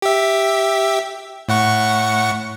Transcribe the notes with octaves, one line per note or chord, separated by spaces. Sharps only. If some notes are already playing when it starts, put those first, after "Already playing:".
G4 E5
A2 F#5 C#6